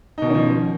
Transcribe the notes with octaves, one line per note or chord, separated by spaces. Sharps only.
B2 D#3 F3 C#4 D#4